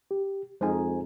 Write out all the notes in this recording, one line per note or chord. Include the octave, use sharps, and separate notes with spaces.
G4
F2 G#3 D#4 C5 G#5